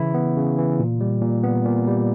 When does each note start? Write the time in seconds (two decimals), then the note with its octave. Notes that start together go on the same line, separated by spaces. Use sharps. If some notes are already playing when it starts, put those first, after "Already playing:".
Already playing: C#3 E3 E4
0.14 B3
0.37 C#3
0.58 E3
0.79 A#2
1.01 G3
1.22 A#2
1.44 B3
1.65 A#2
1.87 G3